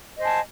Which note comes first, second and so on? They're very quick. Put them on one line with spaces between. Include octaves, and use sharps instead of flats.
D#5 C5 G#5 A5